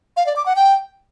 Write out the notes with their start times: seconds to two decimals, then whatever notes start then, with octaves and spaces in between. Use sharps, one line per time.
0.17 F5
0.26 D5
0.36 D6
0.46 F#5
0.56 G5